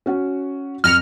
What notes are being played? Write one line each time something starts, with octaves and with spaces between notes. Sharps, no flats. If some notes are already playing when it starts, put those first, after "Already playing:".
C#4 F#4 F#5
F2 F6 A#6 C#7